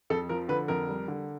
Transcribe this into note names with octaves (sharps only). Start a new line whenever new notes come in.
F2 A4
F3 A#4
D3 B4
F2 A#4
G3
D3